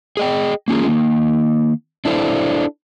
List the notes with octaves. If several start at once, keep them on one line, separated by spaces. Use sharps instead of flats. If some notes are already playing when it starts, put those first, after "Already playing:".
G#4 D#5 G5
A#3 C#4 F4 G#4
D#3 A#3
D4 E4 A4 C5 F5